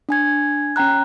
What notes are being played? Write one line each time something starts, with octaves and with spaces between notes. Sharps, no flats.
D4 G#5 G#6
C#4 G5 A#5 F#6